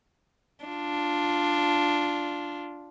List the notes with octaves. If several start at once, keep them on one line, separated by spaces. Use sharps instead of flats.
D4 F4